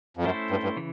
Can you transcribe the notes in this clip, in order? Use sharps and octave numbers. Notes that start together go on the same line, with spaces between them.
F2
F#2 A3 C#4 E4 A4 C5
G2
G2
C#3 E3